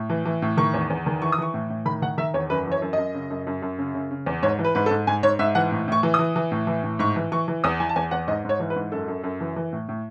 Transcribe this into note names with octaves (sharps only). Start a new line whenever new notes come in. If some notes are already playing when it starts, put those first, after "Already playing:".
Already playing: A2
E3
E3
A2
D#3 C#6
E2
E2
D#3
E3 C#6
D#6
E3 C#6
A2
A2
D#3 B5
D#3 F#5
D#3 E5
E2 C#5
F#2 B4
E3 C#5
F#2
F#2 D#5
C#3
F#2
F#2
F#2
C#3
C#3
C#3
E2
G#2 C#5
E3
B4
G#2 B4
A4
G#2
G#2 G#5
G#2 C#5
G#2 E5
E3 F#5
A2
A2 C#6
E3
D#6
E3
E3
A2
E3
A2
G#2 C#6
E3
E3 C#6
E3
E2 D#6
E3 G#5
A5
E2 G#5
E2 F#5
G#2 D#5
G#2 C#5
E3
B4
G#2
F#2 A4
F#2
F#2
E3
E3
A2
A2